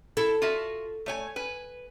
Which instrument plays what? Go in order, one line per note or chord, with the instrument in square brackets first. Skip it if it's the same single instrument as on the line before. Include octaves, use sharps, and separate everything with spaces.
[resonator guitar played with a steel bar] E4 [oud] A4
[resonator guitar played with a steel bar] F4 F#4 E5
A3 C#5 G#5
B4 G#5